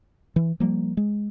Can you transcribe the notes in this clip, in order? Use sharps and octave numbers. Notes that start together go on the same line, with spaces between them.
E3
F3 G3 A#3
G#3